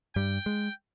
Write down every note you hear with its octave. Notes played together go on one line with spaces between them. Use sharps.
G2 G3 G5
G#3